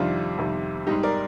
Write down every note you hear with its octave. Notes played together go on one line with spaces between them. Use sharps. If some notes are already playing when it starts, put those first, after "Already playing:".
Already playing: F2 C3 D#3 G3 D4 F4
F2 C3 D#3 G3
G#2 G3 D#4 G4
A#4 D5